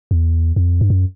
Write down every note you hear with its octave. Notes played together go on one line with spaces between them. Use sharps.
E2
F2
G2
F#2